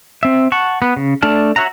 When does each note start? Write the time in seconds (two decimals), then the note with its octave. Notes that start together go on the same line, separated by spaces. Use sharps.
0.23 C4 E5
0.52 F#5 A5 C#6
0.82 B3
0.97 C#3
1.22 A3 D4 D5 A5 F6
1.56 F#4 C#5 E5 F#5 A#5